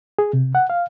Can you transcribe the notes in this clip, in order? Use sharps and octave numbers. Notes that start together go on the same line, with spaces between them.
G#4
C3
F#5
F5